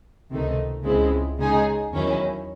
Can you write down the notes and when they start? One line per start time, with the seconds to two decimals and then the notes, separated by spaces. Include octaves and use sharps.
0.31 C#2 C3 D#3 A3 D#4
0.84 C#2 C#3 G#3 C4 E4
1.38 C#3 G#3 D#4 G#4
1.92 E2 D#3 F#3 C#4 E4